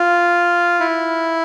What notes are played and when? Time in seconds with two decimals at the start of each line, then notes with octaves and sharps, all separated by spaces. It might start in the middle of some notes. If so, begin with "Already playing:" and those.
Already playing: F4
0.80 E4